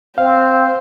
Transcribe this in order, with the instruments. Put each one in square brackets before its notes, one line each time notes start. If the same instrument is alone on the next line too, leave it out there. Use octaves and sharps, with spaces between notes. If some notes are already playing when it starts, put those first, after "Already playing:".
[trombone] C4 [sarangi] C5 [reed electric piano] F5